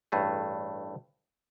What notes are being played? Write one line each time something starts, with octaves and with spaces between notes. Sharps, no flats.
A1 G2 A3 G#4